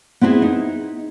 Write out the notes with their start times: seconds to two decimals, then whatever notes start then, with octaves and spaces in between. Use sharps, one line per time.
0.21 B3 C4 E4 G4 G#4
0.42 D#4